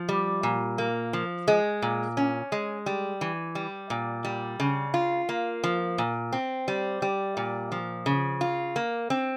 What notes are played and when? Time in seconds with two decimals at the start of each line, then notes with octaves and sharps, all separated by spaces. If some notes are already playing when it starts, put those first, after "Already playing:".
Already playing: F3
0.09 G3
0.43 A#2
0.78 A#3
1.13 F3
1.48 G#3
1.82 A#2
2.17 C#4
2.52 G#3
2.86 G3
3.21 E3
3.55 G3
3.90 A#2
4.25 G3
4.60 C#3
4.94 F4
5.29 A#3
5.64 F3
5.98 A#2
6.32 C4
6.68 G3
7.02 G3
7.37 A#2
7.72 F3
8.06 C#3
8.41 F4
8.76 A#3
9.10 C4